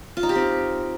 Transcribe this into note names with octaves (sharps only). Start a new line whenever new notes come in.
F4
D#4
G4
C4